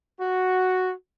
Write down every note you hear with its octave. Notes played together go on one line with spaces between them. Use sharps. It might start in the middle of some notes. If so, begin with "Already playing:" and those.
F#4